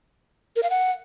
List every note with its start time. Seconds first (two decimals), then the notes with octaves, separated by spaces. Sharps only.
0.56 A#4
0.63 F5
0.70 F#5